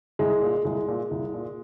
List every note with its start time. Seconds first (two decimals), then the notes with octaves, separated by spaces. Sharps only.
0.19 C2 G#3
0.42 A#2
0.65 C2 G#3
0.88 A#2
1.11 C2
1.34 A#2